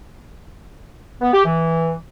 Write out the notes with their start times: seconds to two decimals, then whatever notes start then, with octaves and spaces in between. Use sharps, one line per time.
1.21 B3
1.33 G4
1.44 E3